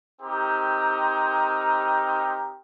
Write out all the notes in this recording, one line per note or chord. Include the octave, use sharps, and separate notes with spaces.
C4 D#4 G4 A#4